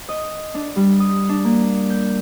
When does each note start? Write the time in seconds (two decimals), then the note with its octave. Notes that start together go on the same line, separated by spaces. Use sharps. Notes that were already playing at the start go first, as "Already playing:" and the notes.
0.09 D#5
0.54 D4
0.76 G3
1.00 D#6
1.29 D4
1.44 A#3
1.90 G6